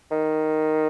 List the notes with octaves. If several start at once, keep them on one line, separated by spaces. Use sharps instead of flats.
D#3